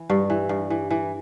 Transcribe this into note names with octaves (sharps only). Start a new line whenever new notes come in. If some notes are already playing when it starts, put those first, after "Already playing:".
Already playing: E3
G2
E3
G2
E3
E3